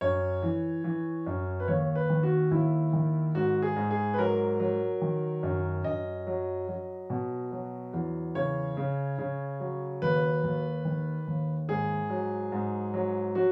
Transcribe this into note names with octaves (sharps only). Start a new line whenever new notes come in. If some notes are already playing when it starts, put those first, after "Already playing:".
F#2 C#5
E3
E3
F#2
B4
D#2 C#5
B4
D#3
F#4
D#2 E4
D#3
G#2 F#4
G#4
G#2
G#4
B4
F#3 A#4
F#3
D#3
F#2
F#2 D#5
F#3
F#3
B2
F#3
E2
C#3 C#5
C#3
C#3
F#3
D#2 B4
D#2
D#3
D#2
G#2 G#4
F#3
G#2
F#3
F#3 F#4